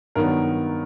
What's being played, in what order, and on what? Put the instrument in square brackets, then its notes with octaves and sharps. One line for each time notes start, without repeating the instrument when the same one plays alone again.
[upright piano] G2 D#3 F#3 B3 A#4